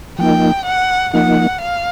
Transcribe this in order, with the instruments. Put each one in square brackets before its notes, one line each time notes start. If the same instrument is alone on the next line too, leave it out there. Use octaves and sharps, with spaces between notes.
[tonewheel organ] F3 A#3 D#4 [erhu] G5
[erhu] F#5
[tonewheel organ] F3 A#3 D#4 [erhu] F#5
[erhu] F5